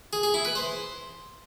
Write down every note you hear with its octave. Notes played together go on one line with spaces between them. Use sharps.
G#4
G#4
E4
B4
C5